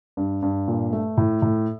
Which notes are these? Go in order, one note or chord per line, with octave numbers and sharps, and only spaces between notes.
G2
G2
A#2
A3
A2
A2